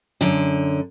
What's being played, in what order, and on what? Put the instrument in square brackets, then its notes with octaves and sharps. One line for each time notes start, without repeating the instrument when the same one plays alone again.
[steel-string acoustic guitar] F#2 D3